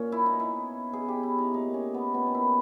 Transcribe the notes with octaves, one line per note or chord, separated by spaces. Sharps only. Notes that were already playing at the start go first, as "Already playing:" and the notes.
Already playing: A#2 C#4
E4
D#4
B2
E4
B2 G#4
G4
E4
D#4
A#2 D#4
C#4
B3
A#2 B3
D#4
E4